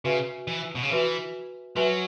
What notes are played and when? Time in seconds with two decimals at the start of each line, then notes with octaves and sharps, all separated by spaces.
0.05 C#3 F#4 B4 E5 G#5
0.48 E3
0.75 B2
0.83 C#3
0.90 E3 F#4 B4 E5 G#5
1.76 F#3 F#4 B4 E5 G#5